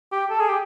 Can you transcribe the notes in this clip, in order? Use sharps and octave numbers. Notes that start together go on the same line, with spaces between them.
G4
A4
G#4
G4